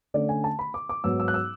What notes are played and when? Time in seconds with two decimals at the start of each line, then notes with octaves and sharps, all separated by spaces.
0.14 D3 A3 C#4 D5
0.29 G#5
0.44 A5
0.59 B5
0.74 D6
0.89 D6
1.04 G#2 F#3 B3 E6
1.20 E6
1.28 F#6
1.34 E6